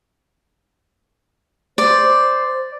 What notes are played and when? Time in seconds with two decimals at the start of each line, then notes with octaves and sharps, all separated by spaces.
1.78 C5 D5